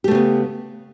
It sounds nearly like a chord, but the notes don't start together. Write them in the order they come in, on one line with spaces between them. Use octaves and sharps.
G4 A3 C#3 B3